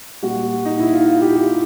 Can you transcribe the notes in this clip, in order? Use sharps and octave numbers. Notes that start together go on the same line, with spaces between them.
A#2 G3 F#4
D#4
E4
F4
F4
G4
G4